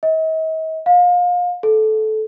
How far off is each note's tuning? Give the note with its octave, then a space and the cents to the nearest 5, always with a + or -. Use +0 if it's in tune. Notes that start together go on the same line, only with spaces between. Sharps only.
D#5 +45
F5 +30
A4 -20